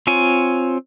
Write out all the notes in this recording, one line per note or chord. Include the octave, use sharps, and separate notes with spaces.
C4 F4 C#5 G#5